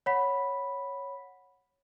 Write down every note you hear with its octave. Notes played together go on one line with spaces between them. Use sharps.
C#5 F#5 B5 B6